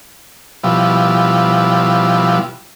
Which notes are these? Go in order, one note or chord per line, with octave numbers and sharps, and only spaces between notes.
B2 F3 G3 E4